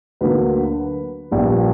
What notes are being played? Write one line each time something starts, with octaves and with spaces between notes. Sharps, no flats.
D2 D3 F#3 A#3 B4
A#1 A#2 G3